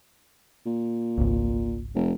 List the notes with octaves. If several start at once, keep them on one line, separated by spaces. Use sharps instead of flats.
A#2
G#1 C#2
F1